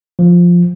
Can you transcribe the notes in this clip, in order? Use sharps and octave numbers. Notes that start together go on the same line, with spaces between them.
F3